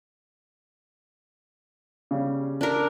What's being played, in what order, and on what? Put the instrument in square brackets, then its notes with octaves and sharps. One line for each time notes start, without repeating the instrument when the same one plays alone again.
[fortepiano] C#3 G3
[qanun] D4 A#4